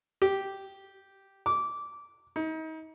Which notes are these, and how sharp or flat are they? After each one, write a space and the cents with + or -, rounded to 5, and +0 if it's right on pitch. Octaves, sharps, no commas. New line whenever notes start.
G4 -5
D6 -15
D#4 +35